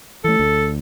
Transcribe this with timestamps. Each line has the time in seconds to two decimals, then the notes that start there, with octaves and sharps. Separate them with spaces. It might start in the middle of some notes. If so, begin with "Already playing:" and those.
0.24 E3 A3 A4
0.40 D2